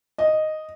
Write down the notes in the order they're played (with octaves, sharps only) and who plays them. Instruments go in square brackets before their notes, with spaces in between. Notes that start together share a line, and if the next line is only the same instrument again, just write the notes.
[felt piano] D#5